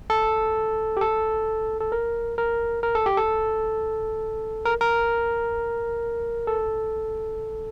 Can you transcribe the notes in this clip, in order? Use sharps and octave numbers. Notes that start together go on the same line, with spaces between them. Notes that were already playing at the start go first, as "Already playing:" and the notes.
A4
G4
A4
A4
A#4
A#4
A#4
A4
G4
A4
A#4
A#4
A4